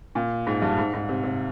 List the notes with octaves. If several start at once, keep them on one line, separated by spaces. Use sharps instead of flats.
A#2
G#2
G2
G#2
G#2
C3
C3